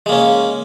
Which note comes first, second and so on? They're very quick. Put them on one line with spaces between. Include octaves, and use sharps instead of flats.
G#3 A#3 C#4